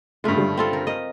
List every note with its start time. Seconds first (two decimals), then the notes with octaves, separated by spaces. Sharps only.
0.24 G2 C#3 G#3 A3 F4
0.37 D3 G3
0.57 C4 F4 A4
0.73 A#4
0.87 A#4 D#5